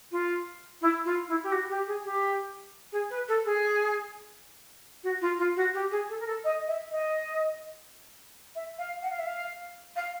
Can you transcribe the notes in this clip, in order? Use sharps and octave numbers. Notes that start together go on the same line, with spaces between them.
F4
E4
F4
E4
G4
F#4
G4
G#4
G4
G#4
B4
A4
G#4
F#4
F4
F4
F#4
G4
G#4
A4
A#4
A4
D#5
E5
D#5
E5
F5
F#5
F5
E5
F5
F5